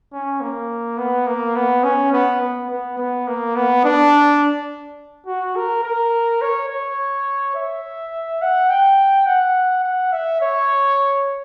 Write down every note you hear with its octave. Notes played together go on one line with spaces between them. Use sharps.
C#4
A#3
B3
A#3
B3
C#4
B3
B3
B3
B3
A#3
B3
D4
F#4
A#4
A#4
C#5
C#5
E5
F#5
G5
F#5
F#5
E5
C#5